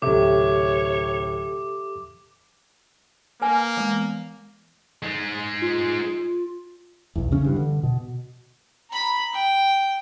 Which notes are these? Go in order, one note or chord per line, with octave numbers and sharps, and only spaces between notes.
D1 C3 G4 A4 C#5 E5 D6
A#3 B4 G#5
E3 G#3 B3
G#3 D#4
F4
B1 E2
C#3 C#4
G2 E3
D3
B2
A#5 B5
G5